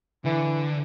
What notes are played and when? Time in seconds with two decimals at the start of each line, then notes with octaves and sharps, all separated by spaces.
0.25 D3 E3